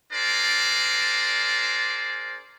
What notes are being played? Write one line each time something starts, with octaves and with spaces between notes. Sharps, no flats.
D4 G#4 A#4 C5 D5